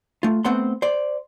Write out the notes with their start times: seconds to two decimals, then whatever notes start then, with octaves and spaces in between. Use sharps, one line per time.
0.23 A3 F4
0.44 A3 B3 C4 C5 F#5 C6
0.82 C5 D5